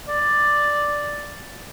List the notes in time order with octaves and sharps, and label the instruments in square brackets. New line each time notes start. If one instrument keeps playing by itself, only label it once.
[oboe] D5